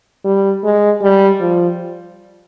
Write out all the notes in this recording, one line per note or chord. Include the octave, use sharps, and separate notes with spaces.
G3
G#3
G3
F3